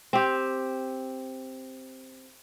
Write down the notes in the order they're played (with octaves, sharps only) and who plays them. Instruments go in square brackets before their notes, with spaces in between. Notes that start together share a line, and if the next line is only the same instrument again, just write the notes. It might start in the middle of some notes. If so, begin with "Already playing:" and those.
[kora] C4 G4